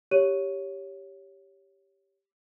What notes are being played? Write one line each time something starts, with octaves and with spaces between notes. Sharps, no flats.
G4 C#5 D#7